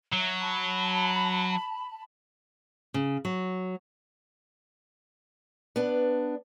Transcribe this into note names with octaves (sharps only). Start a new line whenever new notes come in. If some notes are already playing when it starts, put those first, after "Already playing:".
F#3 E5
A5 B5
C#3
F#3
B3 D4